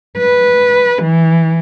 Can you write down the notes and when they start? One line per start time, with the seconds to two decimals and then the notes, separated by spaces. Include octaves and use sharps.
0.18 B4
1.02 E3